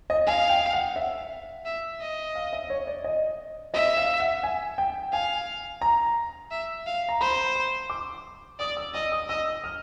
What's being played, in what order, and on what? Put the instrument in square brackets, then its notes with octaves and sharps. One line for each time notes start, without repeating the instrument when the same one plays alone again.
[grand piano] D#5
[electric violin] F5 [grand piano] G#5
[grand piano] G5
F#5
E5
[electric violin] E5
D#5
[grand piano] F5
E5
C#5
D5
D#5
[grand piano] D#5 [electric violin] E5
[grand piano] F5
F#5
G#5
G5
[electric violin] F5 [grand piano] G#5
[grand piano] A#5
[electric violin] E5
F5
[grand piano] A#5
[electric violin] C5 [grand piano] B5
[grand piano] C6
D6
[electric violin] D5 [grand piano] D#6
[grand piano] E6
[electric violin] D#5 [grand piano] E6
[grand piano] D#6
[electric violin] D#5 [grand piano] E6
[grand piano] F6